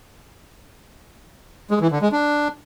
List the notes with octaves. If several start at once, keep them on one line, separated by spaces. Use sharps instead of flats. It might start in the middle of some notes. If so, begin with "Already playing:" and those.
G#3
E3
D3
G#3
D4